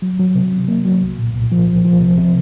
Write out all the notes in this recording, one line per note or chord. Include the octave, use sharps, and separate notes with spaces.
F#3
F#3
C3
C3
A#3
F#3
C2
A#2
C2
F3
C2
F3
C3
C3